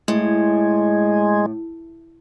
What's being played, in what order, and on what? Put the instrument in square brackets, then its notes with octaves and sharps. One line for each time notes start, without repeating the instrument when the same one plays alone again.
[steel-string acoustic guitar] A2 [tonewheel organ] G#3